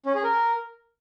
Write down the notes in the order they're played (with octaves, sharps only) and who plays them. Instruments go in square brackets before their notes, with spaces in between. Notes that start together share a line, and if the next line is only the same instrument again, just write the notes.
[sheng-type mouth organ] C#4
G#4
A#4